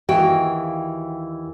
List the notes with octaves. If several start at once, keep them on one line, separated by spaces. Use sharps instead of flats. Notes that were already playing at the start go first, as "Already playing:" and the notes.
D#2 E3 F#4 F5 G5